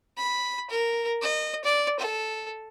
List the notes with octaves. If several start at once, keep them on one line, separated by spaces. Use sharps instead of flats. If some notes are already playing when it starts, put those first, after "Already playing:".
B5
A#4
D#5
D5
A4